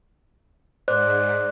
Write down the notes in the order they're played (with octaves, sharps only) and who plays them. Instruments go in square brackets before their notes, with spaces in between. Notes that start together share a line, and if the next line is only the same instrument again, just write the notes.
[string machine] G#2 [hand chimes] C5 D5 F#6